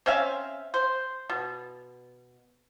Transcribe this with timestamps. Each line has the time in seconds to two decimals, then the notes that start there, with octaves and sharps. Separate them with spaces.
0.06 C4 C#4 E5 F5
0.74 C5
1.29 B2